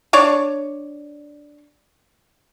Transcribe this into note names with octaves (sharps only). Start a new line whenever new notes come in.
D4 C#5 D5 C#6